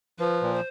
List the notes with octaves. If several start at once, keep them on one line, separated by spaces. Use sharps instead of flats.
F3 B4
A#2
C5